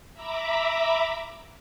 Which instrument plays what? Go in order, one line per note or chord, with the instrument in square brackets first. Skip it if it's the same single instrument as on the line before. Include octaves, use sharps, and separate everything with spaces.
[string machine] E5 A#5 B5 D6